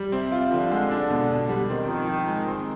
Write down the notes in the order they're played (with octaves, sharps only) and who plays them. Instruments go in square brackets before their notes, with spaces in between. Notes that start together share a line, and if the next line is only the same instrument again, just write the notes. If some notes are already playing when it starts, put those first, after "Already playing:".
Already playing: [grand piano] G3
[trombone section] C3 [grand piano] C4
[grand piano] F4
[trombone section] D3 [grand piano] F3
[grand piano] G#3
D4
B2
B2
G3
[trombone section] D#3 [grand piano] C4
[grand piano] F3
F3
G#3
C4